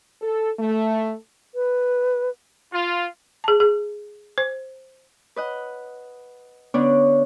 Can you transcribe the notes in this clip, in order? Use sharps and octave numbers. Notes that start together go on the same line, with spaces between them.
A4
A3
B4
F4
G#4 A5
G#4
C5
B4 D#5 F#5
D3 B3 C#4 D4